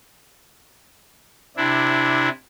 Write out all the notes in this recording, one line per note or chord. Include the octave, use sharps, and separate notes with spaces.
C3 D4 E4